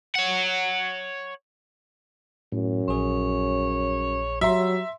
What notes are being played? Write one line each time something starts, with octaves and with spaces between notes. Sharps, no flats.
C#5 F#5
F#2 A2
A#1 G#4 C#5
F#3 G3 E5 A#5 C6